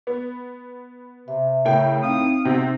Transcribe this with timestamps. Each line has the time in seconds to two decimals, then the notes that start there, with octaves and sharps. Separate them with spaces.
0.07 B3
1.28 C3 E5
1.65 A2 C#3 A#4 G5
2.03 C4 D#4 F5 D#6
2.45 G#2 C3 B3 G5